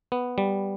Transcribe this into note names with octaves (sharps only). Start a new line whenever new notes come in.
B3
G3